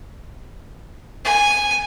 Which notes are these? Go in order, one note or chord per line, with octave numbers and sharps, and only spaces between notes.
G#5